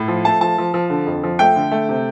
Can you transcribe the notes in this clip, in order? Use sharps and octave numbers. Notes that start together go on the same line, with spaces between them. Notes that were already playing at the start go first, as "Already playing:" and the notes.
Already playing: A2
F3
A3 A5
F3 A5
F3
F3
D3
F2
F3
A3 G5
D3
A3
C3